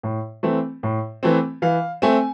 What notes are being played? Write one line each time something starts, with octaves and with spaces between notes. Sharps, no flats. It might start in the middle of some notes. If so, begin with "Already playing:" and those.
A2
E3 A3 C4
A2
E3 A3 C4
E3 F5
A3 C4 G#5